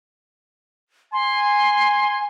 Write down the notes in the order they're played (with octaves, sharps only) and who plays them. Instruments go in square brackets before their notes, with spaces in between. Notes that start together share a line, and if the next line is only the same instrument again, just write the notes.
[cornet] G#5 [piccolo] C6